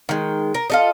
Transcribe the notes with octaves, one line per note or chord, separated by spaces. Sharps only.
D#3 G#3
A#4
F4 A4 D#5